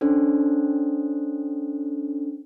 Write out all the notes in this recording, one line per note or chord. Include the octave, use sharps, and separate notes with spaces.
C#4 D4 A4 C5